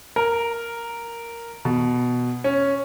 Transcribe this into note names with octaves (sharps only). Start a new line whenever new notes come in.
A#4
B2
C#4